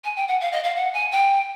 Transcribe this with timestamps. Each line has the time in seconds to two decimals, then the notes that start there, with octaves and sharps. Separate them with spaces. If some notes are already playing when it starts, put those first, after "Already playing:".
0.04 G#5
0.16 G5
0.28 F#5
0.40 F5
0.52 D#5
0.64 F5
0.76 F#5
0.93 G#5
1.11 G5